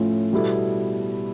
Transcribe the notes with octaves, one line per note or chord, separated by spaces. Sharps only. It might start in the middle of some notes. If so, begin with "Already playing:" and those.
Already playing: A2 F3 A3 C#4 F4
B2 G3 B3 E4 A4